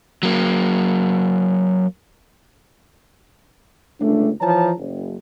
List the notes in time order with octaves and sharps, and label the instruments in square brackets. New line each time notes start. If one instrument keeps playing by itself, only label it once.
[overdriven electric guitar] F#3 A#3
[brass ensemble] G1 C#2 A3 D4
E3 F3 C#5 A5 A#5
F#1